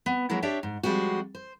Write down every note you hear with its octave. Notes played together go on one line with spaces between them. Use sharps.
B3
F#3 G#3 A#3 B3 E4
D4 G4 C#5 D5 E5 G5
G#2
F3 G3 G#3 C4 F#4
C5